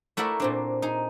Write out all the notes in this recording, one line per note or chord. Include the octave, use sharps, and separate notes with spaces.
A3 E4 F#4 A#4 D5 E5
A#2 C4 D4
D#4 G#4